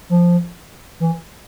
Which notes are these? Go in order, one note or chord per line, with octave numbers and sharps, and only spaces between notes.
F3
E3